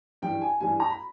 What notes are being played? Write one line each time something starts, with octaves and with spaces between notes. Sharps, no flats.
G2 E3 G3 G5
G#5
G2 E3 G3 G#5
A#5
B5